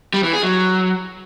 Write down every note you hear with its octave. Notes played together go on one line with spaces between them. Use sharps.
G3
E3
G#4
F#3